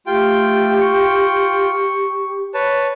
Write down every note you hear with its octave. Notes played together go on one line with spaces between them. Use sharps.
A3 F4 G4 G5
C#6
B4 C#5 A5